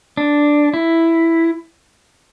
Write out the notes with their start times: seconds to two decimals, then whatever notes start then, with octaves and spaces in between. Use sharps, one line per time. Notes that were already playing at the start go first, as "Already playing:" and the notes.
0.17 D4
0.74 E4